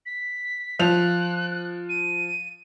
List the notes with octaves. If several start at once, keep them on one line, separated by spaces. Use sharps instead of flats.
B6
F3 F#6 F7
D#7